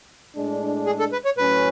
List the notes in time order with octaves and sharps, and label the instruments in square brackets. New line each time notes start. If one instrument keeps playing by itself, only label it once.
[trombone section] A2 G#3 D4
[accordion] G#4
A4
B4
C#5
[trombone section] A2 F#3 C#4 [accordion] B4